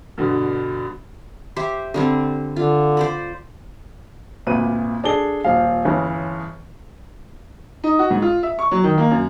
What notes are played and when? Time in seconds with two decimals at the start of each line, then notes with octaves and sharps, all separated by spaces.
0.18 G2 B2 D3
1.56 G4 C5 E5
1.94 D3 G3 C4
2.56 D3 F4
2.97 C5 D5 B5
4.47 G#1 D2 A#2 B4 D#7
5.04 D4 G#4 A4 G7
5.44 D#1 F3 F5
5.85 G1 C#3 E3
7.84 D#4
7.99 F#4
8.10 G#2
8.22 F4
8.43 E5
8.59 C#6
8.71 F#3
8.84 D#3
8.98 A#3
9.11 F#2